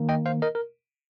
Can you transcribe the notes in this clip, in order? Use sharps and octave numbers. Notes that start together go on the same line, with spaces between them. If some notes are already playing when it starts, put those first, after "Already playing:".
Already playing: D#3 A#3
D#5 G5
C5 F5
A#4 D#5
A#4